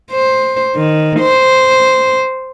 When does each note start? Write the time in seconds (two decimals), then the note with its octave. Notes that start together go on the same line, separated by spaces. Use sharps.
0.12 C5
0.76 D#3
1.20 C5